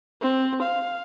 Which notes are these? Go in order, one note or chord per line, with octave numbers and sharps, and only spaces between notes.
C4
F5